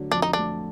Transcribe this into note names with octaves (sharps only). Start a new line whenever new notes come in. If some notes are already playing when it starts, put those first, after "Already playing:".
Already playing: D3 F#3 A3
F2 D4
D#4
A3 D4